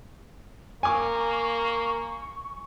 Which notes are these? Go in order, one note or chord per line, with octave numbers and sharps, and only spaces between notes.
A#3 G#5 C#6 D6